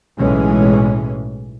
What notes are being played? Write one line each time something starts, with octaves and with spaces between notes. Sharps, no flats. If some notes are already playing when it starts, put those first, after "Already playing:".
B1 A2 E3 G#3 C#4